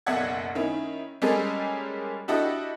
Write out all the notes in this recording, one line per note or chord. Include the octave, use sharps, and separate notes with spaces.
F#1 B1 D5 E5 F#5 G#6
D#3 C#4 E4
G3 G#3 A#3 C#4 G#4 A4
D4 E4 F#4 G4 A4 D#5